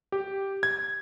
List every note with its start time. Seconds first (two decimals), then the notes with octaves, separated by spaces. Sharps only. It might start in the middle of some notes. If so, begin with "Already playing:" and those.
0.12 G4
0.63 G#6